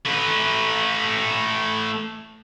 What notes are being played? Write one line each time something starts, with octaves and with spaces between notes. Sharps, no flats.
A3 B4